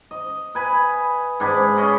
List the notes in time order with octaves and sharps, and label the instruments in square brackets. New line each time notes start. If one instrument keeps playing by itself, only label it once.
[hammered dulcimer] D#5
B4 G#5 B5
G#2 D4 G#5 B5
C#4 D#5 B5 C6